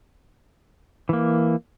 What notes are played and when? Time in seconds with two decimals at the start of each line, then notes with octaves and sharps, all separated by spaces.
1.09 E3 A#3